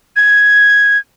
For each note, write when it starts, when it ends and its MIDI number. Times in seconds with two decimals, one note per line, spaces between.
0.16 0.98 92